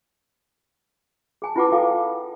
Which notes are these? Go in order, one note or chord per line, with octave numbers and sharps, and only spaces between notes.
G#4 G#5 A5
E4 F4 B4 F#5 A5 D6
F4 A4 F5 G5 D6